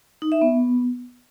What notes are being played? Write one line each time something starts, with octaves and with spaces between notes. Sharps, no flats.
D#4
E5
B3